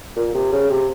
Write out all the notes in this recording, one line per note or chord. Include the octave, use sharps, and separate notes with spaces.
A#2
C3
C#3
C3